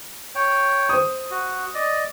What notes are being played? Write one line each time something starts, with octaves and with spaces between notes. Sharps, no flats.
C#5 G5
C5 D#6
F#4
D5 D#5